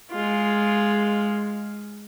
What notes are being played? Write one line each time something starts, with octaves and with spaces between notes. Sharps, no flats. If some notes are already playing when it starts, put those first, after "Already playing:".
G#3 F4